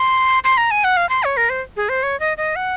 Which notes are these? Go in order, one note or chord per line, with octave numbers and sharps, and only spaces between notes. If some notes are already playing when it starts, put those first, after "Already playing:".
Already playing: C6
C6
A#5
G#5
F#5
F5
C6
C#5
A#4
C5
G#4
C5
C#5
D#5
D#5
F#5